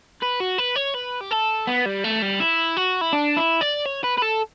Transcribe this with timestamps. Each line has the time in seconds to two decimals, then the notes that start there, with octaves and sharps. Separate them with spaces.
0.22 B4
0.40 F#4
0.58 B4
0.76 C#5
0.94 B4
1.21 G4
1.31 A4
1.67 B3
1.86 G3
2.04 A3
2.22 G3
2.40 E4
2.77 F#4
3.01 E4
3.13 D4
3.37 E4
3.61 D5
3.86 C#5
4.04 B4
4.17 B4
4.22 A4